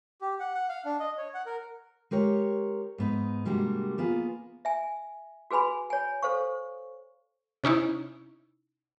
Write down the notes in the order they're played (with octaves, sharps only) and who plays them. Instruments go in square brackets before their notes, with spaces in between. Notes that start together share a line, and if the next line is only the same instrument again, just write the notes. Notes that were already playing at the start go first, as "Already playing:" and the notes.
[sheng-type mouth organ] G4
F#5
F#5
F5
D4
D#5
C#5
F#5
A#4
[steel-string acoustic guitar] G#3 G4 A#4 C#5
G#2 B3 D#4
C3 G3 G#3 A#3 D4 F#4
A#3 B3 F4 G#4
[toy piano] E5 G#5
F#4 G#4 B4 G#5 B5
C#5 G#5
A4 C5 F5 C#6
[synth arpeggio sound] C3 C#4 D#4 E4